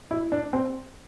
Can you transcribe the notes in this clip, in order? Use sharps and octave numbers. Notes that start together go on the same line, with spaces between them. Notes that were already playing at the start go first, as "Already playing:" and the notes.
E4
D4
C4